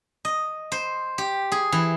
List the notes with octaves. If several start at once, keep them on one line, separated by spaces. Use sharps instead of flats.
D#5
C5
G4
G#4
E3